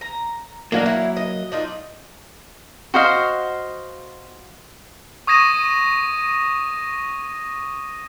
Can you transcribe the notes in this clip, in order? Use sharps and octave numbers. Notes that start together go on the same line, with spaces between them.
A#5
D#3 F#3 A#3 D4 F5
E4
D#5
D4 D#4 F4
F#4 C5 D#5 F5
C#6 D#6 G#6 A#6 D#7 E7